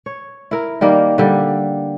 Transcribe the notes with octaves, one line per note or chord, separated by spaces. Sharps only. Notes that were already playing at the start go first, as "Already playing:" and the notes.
C#5
E4 A#4
D#3 G3 A#3 A#4
D3 G3